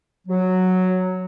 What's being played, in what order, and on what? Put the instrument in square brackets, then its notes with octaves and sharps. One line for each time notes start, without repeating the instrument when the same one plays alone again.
[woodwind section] F#3